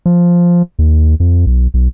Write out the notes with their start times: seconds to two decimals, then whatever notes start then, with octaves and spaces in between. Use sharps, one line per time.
0.06 F3
0.79 D#2
1.20 F2
1.47 B1
1.74 B1